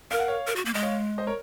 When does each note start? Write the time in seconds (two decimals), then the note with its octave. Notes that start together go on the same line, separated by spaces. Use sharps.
0.11 A#4 F5
0.19 F#5
0.28 C#5 F5
0.47 A#4
0.56 F#4
0.65 A#3
0.74 G#3 D#5
0.83 C#5 F5
1.18 C5 D#5
1.27 A#4 C#5